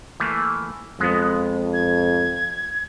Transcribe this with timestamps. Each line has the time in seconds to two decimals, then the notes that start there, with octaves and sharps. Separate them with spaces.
0.20 E3 A3 A#3
1.00 F2 G#3 B3
1.74 G#6